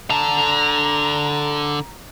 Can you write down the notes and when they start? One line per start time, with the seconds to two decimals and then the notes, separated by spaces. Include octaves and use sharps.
0.10 D3 A5 A#5